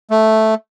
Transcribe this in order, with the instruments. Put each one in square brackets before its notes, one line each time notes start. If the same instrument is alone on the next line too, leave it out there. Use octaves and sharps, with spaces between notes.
[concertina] A3